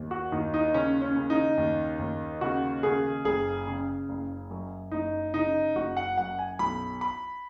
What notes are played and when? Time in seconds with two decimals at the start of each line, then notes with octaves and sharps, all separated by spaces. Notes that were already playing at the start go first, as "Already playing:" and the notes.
Already playing: D#2
0.11 F#4
0.32 D#2 D#4
0.54 D#4
0.74 C#3 C#4
1.02 C#4
1.16 C#3
1.30 D#4
1.58 D#2
1.99 D#2
2.41 C#3 F#4
2.83 C#3 G#4
3.25 F#1 G#4
3.67 C#3
4.09 F#1
4.51 F#2
4.91 F#1 D#4
5.34 C#3 D#4
5.75 F#1 F#4
5.97 F#5
6.18 F#2 F#5
6.39 G#5
6.59 B1 B5
7.01 B5